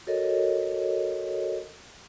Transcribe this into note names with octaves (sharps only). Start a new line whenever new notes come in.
F#4 A4 A#4 C#5 D#5